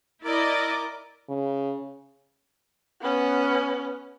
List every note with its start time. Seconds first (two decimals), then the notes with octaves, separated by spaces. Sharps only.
0.24 E4 A#4 D5 D#5 D6
1.29 C#3
3.00 B3 C#4